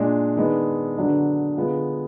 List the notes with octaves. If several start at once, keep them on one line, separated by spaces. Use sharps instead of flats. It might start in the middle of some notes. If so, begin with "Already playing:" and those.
Already playing: A#2 G#3 D4
D#3 G#3 B3 D4
D3 F#3 D4 G#4 B4
D3 G#3 B3 F4 G#4